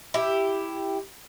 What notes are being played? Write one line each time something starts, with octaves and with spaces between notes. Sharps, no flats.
E4 G4